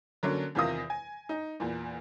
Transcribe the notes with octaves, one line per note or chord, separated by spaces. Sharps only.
D3 F#3 A#3 C#4 D4
E2 C3 D#3 F4 D#6 A#6
G#5
D#4
E2 A#2